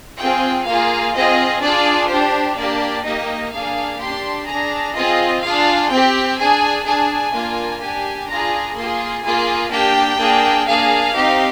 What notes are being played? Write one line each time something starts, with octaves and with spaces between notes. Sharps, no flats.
C4 F4 G#4 G5
A#3 F4 G#4 F5
C4 F4 G#4 D#5
D4 F4 G#4 D5
D4 G4 C5
A#3 D4 G4 D5
A#3 D#4 G4 D#5
A#3 D4 G#4 F5
D4 G4 C6
D4 G#4 A#5
C4 F4 G#4 D#5
D4 F4 G#4 F5
C4 G4 G5
D4 G#4 G#5
D4 G#4 G#5
A#3 D4 F4
D4 G4 G#5
D4 F4 G#4 A#5
A#3 F4 G#4 C6
A#3 F4 G#4 G#5
A#3 D4 G4 G5
A#3 D4 G#4
A#3 D4 G#4 F5
C4 D#4 G4